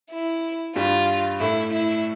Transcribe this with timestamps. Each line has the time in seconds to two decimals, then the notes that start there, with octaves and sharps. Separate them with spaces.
0.11 E4
0.76 G2 G3 F4
1.40 A2 A3 E4
1.72 E4